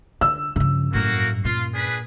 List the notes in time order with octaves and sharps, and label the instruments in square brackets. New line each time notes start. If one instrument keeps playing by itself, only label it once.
[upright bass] D3 [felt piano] E6
[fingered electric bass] G2 C#4 [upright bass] C#3 F3
[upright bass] F#2 A2 [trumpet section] A#3 F#4
[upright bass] A#2 [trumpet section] F4 C6
[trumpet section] D4 G#4 B4